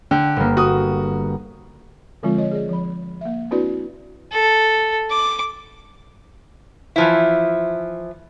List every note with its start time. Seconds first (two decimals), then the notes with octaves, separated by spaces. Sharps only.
0.11 D3 G5
0.37 G1 A#3
0.57 F#4 D#6
2.23 D3 F3 G#3 C4 F4
2.38 C#5 D#5
2.51 G#4 D5
2.69 F3 B5
3.21 A#3 E5
3.51 C4 D4 E4 F#4 B4 D5
4.32 A4
5.10 D6
6.96 E3 F3 E4